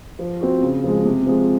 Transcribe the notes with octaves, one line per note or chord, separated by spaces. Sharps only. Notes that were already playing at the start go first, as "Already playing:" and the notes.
F3
C4 F#4
C#3
F3 G#3
C3
F3 G#3